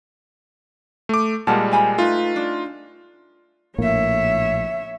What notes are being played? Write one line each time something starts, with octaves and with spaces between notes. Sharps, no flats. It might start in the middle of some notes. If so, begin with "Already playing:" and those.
A3 D6
A#2 G3 G#3 A#4 F#5 A5
C5 G#5 B5
A3 D#4 F4 B4 E5
D4
A#1 A2 A#3 C#5 E5